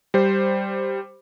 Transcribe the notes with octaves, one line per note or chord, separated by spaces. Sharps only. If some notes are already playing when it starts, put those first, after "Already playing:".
G3 C5